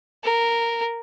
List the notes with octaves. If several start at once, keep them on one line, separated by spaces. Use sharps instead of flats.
A#4